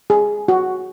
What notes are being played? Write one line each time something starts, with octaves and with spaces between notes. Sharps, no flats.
G#4
F#4